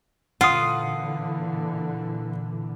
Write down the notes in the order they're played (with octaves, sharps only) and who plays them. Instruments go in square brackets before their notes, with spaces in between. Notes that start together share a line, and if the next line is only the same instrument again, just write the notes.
[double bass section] A#2 D3 E3 [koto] F4 [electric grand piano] F#5 D#6